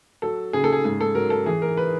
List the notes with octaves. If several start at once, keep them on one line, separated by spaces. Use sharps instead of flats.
F#3 A4
C#3 G#4
A4
G#4
G#2 G#4
A4
F#3 A#4
A4
E3 G#4
A#4
B4